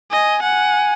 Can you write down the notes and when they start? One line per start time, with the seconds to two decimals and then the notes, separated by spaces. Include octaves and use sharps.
0.12 D#5 G#5
0.42 F#5 G#5